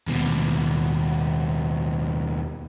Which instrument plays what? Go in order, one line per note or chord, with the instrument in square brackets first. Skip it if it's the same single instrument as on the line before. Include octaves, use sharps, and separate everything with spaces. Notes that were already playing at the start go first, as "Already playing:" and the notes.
[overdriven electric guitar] D#2 B2